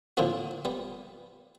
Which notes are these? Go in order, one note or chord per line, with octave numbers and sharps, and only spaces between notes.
A2 D3 F3 A#3 C4 F#4
G3 B3